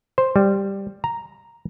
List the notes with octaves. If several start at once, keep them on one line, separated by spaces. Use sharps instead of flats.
C5
G3
A#5